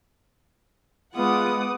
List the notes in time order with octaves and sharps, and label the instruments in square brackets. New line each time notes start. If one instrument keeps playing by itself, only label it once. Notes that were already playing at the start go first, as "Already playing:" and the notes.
[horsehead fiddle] G#3 [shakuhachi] B3 [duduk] F4 [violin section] F#5 D6 D#6